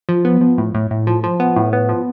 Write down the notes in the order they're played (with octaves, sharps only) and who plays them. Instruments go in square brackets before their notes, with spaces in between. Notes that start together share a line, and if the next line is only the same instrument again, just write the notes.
[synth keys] F3
B3
F3
A2
A2
A2
F3
F3
B3
A2
B3
F3